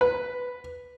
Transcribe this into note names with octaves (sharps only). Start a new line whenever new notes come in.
B4